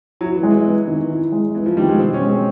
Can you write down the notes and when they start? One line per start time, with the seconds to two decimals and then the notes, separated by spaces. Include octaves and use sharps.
0.21 F#3 E4
0.35 E3
0.43 G#3
0.50 E3
0.65 B3
0.87 D#3
1.10 E4
1.32 G#3
1.54 E3 B3
1.66 F3
1.77 D#3 G3
1.88 G#3
1.99 B2 C4
2.14 C#4
2.22 G#3
2.29 C4